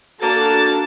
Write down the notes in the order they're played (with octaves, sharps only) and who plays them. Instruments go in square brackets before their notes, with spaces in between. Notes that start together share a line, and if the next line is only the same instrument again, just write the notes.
[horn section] A#3 [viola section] D4 F#4 A4 [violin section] A5 A6